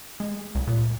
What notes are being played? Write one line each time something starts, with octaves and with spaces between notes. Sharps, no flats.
G#3
C2
A#2